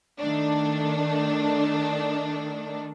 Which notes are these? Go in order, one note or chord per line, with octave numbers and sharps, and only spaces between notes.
D#3 A3 D4